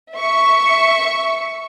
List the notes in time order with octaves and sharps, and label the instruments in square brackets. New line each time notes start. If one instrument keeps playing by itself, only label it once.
[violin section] E5 C#6